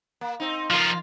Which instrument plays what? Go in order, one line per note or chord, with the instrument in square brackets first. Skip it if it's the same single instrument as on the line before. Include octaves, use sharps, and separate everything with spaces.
[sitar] A#3
C4 D#4
[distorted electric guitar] F3 D#4 [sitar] A#3 F4